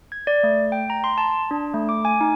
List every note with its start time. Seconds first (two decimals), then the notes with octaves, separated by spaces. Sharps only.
0.12 G#6
0.27 D5
0.43 A3
0.72 G5
0.90 A#5
1.04 C6
1.18 A5
1.51 D4
1.74 A3
1.89 D6
2.05 G#5
2.21 D#4